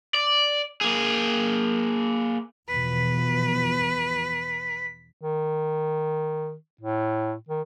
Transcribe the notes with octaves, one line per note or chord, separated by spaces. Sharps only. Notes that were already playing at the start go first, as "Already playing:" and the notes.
D5
A#3 G#4
E2 B2 F3 B4 B6
D#3
A2
D#3